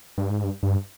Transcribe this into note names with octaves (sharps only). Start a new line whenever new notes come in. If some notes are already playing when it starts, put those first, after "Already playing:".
G2
G#2
G2
G2